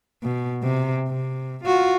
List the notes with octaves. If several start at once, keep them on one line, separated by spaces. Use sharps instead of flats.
B2
C3
C3
F4 F#4